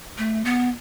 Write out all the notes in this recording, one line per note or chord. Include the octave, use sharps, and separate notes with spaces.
A3
B3